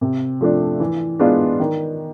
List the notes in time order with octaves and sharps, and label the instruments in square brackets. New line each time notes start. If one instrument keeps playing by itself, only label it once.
[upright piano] C3
F3 A3 D4
E3
G#3 B3 D4 F4
D#3